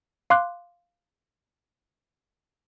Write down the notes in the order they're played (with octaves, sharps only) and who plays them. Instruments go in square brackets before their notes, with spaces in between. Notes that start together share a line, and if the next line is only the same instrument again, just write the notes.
[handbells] F5 C6 D6 F#6